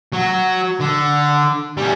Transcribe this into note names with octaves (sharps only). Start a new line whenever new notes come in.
F#3
D3
G3 C#4